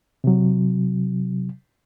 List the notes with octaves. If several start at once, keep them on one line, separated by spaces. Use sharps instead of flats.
C3 F#3